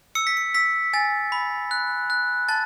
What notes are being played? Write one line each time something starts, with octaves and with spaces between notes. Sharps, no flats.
E6 C#7
B6
C#7
E6 B6
G#5 A6
B5
F#6
F#6
A5 A6